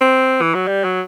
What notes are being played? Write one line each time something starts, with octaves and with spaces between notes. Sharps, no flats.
C4
E3
F#3
G3
F#3